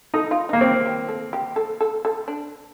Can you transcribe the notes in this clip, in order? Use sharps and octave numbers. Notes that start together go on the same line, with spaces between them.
D#4 A4
F4
D#4
A#3
C4
G4
A4
G4
A4
A4
A4
D4